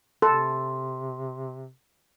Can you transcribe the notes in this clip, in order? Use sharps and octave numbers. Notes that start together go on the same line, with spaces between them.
C3 A4 C6